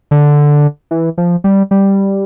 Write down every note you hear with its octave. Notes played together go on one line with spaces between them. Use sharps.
D3
E3
F3
G3
G3